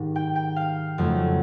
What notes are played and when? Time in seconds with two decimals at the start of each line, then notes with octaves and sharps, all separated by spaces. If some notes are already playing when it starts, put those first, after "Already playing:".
Already playing: G#2 D#3 G3
0.16 G5
0.36 G5
0.56 F5
0.98 F2 C#3 F#3 A3